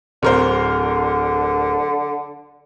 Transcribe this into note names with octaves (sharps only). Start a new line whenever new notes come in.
D1 D3 A#4 C5